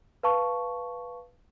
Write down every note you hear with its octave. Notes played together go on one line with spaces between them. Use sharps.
B4 F5 A5 C#6